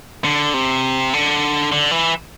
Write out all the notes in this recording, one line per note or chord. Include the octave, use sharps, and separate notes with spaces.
D3
C3
D3
D3
E3